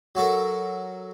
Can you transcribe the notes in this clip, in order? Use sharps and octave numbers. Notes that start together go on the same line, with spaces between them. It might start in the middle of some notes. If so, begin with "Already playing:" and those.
F#3 F#4 A4 A#4